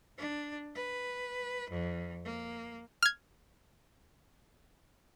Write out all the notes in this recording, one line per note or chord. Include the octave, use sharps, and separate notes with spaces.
D4
B4
F2
A#3
F6 G#6